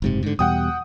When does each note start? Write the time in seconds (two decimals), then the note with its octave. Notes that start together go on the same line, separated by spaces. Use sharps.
0.02 F#1 G#2 C3
0.23 G#2 D3
0.39 E2 B2 G3 F#5 G5 D#6